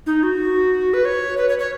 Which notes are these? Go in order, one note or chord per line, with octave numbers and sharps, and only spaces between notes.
D#4
F#4
B4
C#5
B4
C#5
C#5